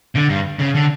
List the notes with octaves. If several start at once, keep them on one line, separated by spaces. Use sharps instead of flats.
D3
G2
C#3
D3